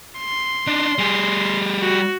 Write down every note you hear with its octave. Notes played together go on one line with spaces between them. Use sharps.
C6
D4 D#4
G3 G#4
F#4